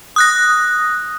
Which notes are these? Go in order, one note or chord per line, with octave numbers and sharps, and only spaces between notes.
D#6 F#6 A#6